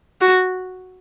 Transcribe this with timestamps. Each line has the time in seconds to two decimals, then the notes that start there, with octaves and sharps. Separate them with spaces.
0.21 F#4